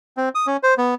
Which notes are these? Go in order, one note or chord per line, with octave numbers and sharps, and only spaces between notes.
C4
D#6
C#4
C5
B3